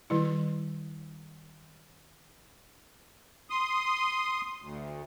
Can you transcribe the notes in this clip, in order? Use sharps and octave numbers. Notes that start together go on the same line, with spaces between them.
D#3 G3 E4
C6 D#6
D2